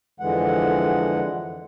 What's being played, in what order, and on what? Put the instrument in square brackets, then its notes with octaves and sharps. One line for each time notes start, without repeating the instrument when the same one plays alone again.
[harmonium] F2 D3 E3 G#3 F#5